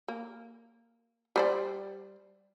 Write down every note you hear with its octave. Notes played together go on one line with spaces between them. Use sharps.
A#3
G3 C5 D5